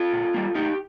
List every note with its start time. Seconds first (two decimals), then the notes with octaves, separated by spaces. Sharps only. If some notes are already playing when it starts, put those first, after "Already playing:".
Already playing: F4 A4
0.13 A#2
0.34 G3 A#3
0.55 A2 D#4 G4